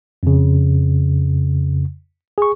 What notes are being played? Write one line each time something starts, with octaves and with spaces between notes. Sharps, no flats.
F2 C#3
G#4 C#6